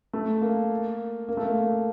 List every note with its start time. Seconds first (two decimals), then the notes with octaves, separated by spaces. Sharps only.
0.13 A3
0.41 A#3
1.29 A#3
1.37 A3
1.46 A#3